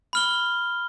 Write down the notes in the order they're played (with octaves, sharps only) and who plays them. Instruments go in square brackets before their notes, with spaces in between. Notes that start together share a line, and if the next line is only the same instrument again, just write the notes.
[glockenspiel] B5 F6 G7